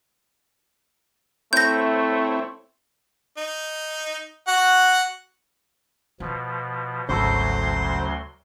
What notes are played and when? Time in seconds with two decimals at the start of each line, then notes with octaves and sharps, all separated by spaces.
1.53 A3 C4 E4 C#5 G6 A#6
3.37 D#4
4.48 F#4 F#5
6.20 B2 F3 F4
7.09 G#1 D2 C#3 F#3 F#4 A4 C5 C6